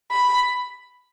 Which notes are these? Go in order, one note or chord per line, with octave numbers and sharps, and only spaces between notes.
B5